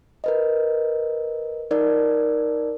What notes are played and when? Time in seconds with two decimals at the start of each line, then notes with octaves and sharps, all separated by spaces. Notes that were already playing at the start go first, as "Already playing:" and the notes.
0.24 A#4 B4 D#5
1.71 D#4 A#4 D5